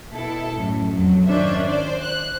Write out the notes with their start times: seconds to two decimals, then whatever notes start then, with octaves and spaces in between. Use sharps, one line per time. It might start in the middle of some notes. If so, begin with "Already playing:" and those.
0.14 B2 E4 A4
0.57 F#2 A2
0.94 F2 F#3
1.27 G#1 D#3 C#4 D4 C5 E5
1.67 C5 D5
2.01 F#6